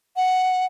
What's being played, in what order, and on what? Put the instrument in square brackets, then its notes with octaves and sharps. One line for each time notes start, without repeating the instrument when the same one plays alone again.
[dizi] F#5